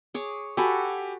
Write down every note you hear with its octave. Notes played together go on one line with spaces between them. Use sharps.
G#4 C#5 D6
F#4 G4 A4 G#5 B5